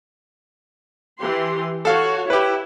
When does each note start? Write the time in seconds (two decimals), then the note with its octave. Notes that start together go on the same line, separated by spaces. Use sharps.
1.20 E3 G4 C6
1.85 F#4 A4 C#5 F5
2.30 E4 G4 B4